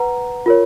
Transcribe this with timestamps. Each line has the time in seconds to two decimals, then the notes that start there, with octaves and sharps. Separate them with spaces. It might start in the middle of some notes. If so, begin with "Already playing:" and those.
Already playing: B4 F#5 A#5
0.46 F4 A#4 C#5